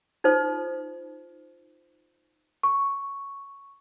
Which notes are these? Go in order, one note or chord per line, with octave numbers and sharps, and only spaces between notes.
D#4 F4 A4 C5
C#6